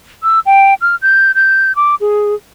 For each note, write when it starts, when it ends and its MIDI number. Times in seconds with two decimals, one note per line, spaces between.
0.23 0.40 88
0.46 0.74 79
0.81 0.96 89
1.02 1.32 91
1.35 1.75 91
1.76 1.95 86
2.01 2.35 68